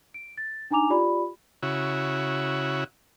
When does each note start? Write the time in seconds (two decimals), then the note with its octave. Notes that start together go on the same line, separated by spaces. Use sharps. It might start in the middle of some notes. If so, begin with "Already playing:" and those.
0.14 D7
0.37 A6
0.71 D4 D#4 G#5 A#5 D6 F7
0.90 F4 G4 D5 B5
1.63 C#3 E4 F#4